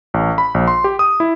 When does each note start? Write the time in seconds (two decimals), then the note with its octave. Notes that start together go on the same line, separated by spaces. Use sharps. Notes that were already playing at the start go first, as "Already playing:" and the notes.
0.14 A1
0.38 B5
0.54 A#1
0.67 C6
0.84 G4
0.99 D#6
1.20 E4